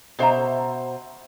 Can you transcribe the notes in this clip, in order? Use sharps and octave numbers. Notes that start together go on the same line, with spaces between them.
B2 C5 E5 A#5